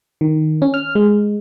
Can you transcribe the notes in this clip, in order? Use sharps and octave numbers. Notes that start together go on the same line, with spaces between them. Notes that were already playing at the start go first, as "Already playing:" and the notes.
D#3
C#4
F6
G#3